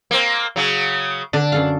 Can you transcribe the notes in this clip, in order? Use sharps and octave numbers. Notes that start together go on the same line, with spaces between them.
A#3 C4
C#3 F#3
D3 D4
F#2 A4 F5